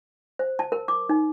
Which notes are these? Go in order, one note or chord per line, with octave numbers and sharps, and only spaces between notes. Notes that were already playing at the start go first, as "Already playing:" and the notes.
C5
A5
A#4
D6
D#4